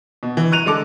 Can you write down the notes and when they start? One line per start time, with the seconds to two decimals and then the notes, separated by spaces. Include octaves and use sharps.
0.23 B2
0.37 E3
0.51 A#5 C#6 F#6 D#7 F7
0.66 D3 G#3 A4 D6